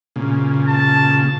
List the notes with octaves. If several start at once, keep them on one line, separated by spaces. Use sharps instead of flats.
A#2 C#3
A5